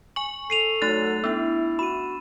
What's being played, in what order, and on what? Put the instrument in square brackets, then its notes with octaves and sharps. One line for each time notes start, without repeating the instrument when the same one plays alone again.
[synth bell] G#5 C#6 [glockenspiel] F#7
[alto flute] A4 [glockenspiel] C7 D#7 F7
[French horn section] F#3 F#4 [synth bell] A3 D#4 F#6 [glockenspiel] A6
[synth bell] B3 D4 [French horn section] E4 [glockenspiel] E6
[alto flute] F#4 [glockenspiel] B5 [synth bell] D#7 E7